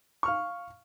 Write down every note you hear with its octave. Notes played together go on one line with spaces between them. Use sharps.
F5 C#6 F6